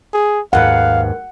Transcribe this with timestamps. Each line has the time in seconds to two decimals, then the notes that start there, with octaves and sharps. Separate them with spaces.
0.13 G#4
0.53 D#2 G#2 B4 F5 F#5